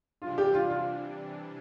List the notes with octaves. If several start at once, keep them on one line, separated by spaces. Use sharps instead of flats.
C3 E3 G3 D4 F4
G4
F4
F4